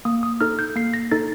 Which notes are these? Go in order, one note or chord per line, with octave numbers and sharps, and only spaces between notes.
A#3 D#6
D#6
D#4 A4 F6
G6
A#3 C7
A#6
D#4 A4 A6